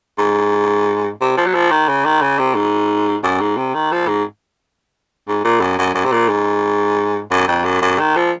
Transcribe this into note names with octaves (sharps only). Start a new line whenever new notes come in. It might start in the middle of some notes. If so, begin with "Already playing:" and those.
G#2
C3
F3
F#3
F3
D#3
C#3
D#3
C#3
C3
G#2
F#2
G#2
C3
D#3
F3
G#2
G#2
A#2
F#2
F#2
F#2
C3
A#2
G#2
F#2
F2
F#2
F#2
D#3
F3